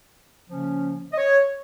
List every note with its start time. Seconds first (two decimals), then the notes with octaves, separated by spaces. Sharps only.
0.49 C#3 F3 A#3 C#4
1.13 D#5
1.18 C#5